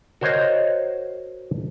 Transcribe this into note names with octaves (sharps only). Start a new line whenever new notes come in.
F#4 A#4 C5 C#5 D#5